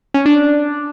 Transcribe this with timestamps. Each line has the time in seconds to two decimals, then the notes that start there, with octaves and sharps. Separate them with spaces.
0.14 C#4
0.26 D4